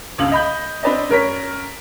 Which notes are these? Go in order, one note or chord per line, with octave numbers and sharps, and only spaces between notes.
G1 C#2 C#3 F#7
D#5 B5 G6
C4 D4 B4 D5 D#5
F#2 A#4 C#5 B6